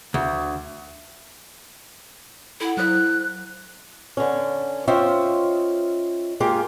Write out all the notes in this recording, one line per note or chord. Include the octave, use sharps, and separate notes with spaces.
D2
E4 A4 F#5
F#3 E4 C5 F#6
D3 C#4
C#4 F4 C5 D#5 E5 G5
G#3 A#3 F4 G4 G#4